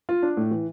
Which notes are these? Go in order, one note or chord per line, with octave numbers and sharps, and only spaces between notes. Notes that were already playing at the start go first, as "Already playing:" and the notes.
F4
D4
A2
E3